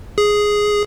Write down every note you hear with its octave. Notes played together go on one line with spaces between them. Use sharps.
G#4